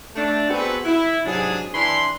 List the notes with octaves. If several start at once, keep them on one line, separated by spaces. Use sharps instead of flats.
A3 D4 D5
B3 C4 F#4 G#4 A4 B4
E4
G#2 C3 F#3 D4 G#4
E3 D4 B5 C6